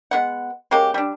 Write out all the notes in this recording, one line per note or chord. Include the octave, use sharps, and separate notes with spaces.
G#3 B3 F#5
G#3 A#3 C#4 G4
G3 D4